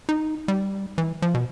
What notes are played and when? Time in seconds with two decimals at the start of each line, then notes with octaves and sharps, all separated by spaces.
0.09 D#4
0.48 G3
0.98 E3
1.22 F3
1.34 B2